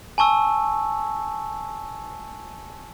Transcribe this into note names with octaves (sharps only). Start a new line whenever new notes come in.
G#5 A5 C#6 E6